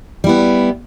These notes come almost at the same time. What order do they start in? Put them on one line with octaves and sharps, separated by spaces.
G3 E4 B3